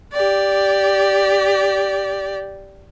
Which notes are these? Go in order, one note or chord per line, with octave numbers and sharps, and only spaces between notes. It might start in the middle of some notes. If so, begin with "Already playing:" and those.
G4 D5